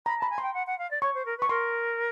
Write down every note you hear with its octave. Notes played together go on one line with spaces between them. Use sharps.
A#5 B5
A5 B5
G#5
G5 C6
F#5
F#5
F5
D5
C#5 C#6
C5
A#4
B4 C#6
A#4 C6